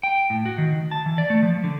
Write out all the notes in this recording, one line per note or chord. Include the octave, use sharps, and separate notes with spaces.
G5
A2
F#4
D#3
A5
E3
D5
A3
F3
D3